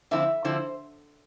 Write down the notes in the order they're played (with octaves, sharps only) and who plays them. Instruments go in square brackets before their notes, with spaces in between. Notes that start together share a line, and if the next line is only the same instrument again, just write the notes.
[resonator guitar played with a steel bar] D3 F3 C4 E4 E5
D3 F3 C4 E4 C5